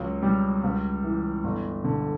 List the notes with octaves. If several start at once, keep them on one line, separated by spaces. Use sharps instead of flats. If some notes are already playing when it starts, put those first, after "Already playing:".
Already playing: C#2 F#3
G3
C#2
E3
G1
D3